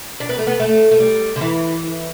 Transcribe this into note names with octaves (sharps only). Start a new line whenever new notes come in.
D4
B3
A3
B3
A3
A3
G3
D3
E3